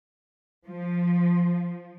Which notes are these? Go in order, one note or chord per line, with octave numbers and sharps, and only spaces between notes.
F3